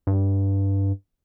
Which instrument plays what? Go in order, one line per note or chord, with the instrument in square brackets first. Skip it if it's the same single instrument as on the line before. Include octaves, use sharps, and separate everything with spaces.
[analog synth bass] G2